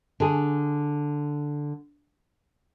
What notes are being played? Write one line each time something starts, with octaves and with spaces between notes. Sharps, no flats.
D3 G#4